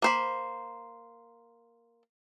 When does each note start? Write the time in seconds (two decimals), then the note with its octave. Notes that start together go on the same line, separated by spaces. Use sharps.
0.02 A#3 C5 B5